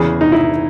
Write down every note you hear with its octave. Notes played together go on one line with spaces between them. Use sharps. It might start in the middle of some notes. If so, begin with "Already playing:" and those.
Already playing: E2 C#3 E3 G#4
D#4
E4